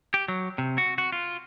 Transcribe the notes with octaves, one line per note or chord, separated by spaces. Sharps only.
G4
F#3
C3
F#4
F#4
F4